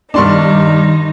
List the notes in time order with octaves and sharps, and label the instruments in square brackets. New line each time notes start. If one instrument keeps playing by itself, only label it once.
[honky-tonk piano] G2 D4 [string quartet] D#3 D#4 [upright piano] D5 C6 C#6